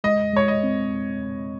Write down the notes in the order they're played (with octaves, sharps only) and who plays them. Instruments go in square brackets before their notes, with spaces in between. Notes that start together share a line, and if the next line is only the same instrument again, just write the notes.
[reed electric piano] G#3 [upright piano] D#5
[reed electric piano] G#3 [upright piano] C#5
[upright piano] D#5
[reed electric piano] C4